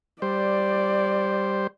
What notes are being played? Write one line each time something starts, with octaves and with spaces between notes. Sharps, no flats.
G3 C5 D5